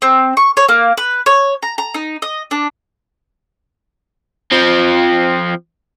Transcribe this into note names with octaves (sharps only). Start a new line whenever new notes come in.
C4
C#6
C#5
A#3
B4
C#5
A#5
A#5
D#4
D#5
D4
F3 C4